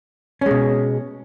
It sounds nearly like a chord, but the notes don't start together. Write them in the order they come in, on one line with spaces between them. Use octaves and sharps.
C#4 G#3 B2